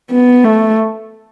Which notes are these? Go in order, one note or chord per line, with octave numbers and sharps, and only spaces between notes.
B3
A3